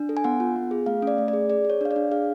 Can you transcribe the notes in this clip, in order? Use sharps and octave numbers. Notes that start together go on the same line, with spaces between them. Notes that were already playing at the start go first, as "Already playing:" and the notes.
Already playing: D4
A4
G#5
B3 F#5
F4
B3
G#4
A3 F5
C#4 D5
A3
D5
G#4
G#4 D5
G#4
C#5
D4 F5
D5
D4
G#4 F5